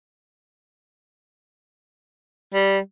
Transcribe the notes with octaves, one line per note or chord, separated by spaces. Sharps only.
G3